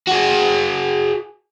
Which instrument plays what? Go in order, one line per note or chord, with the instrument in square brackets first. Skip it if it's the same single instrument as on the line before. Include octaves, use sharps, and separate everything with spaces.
[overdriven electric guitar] F#4 G#4